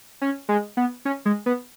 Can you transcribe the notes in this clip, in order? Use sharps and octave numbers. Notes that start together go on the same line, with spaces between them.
C#4
G#3
B3
C#4
G#3
B3